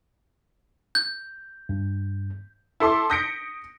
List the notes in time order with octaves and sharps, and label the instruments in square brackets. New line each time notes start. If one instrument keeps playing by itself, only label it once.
[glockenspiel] G6
[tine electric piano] G2
[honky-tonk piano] E4 A4 C6 D6 E6
D#6 G6 A#6 B6 C#7 D7